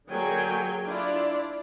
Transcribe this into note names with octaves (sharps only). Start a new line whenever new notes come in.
D3 F#3 A#3 G#4 G5 G#5
D4 E4 F4 D5